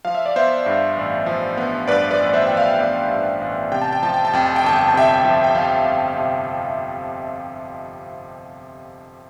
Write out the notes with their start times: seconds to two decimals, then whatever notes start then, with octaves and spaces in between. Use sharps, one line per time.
0.05 F3 F5
0.15 E5
0.26 D5
0.36 B3 C5 E5
0.66 G2
0.97 A1
1.26 F3
1.57 B3
1.88 G2 B4 D5
2.10 B4 D5
2.19 A1
2.29 D5
2.33 C5 E5
2.47 F3 G5
2.57 D5 F5
2.79 B3 D5 F5
3.11 G2
3.41 A1
3.72 C3 G5
3.82 A5
3.93 G5
4.02 F3 A5
4.14 G5
4.25 A5
4.33 F2 G5
4.46 A5
4.56 G5
4.64 G1 A5
4.76 G5
4.88 A5
4.94 C3 E5 G5
5.25 F3
5.44 G5
5.55 F2 F5 A5
5.85 G1
6.16 C3